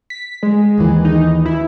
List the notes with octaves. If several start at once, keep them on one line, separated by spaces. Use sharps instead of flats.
B6
G#3
D#2 E3
D#4
E4